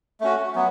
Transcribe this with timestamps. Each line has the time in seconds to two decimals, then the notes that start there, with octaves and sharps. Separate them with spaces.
0.21 A3 C#4 F#4
0.55 F#3 B3